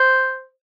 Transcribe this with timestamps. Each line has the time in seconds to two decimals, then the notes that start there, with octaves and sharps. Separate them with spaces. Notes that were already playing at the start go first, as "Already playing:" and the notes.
Already playing: C5